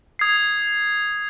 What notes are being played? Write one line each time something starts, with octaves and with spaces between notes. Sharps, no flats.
D#6 G#6 C7